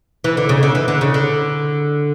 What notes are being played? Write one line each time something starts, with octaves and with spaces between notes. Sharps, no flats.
E3
D3
C#3
D3
E3
D3
C#3
D3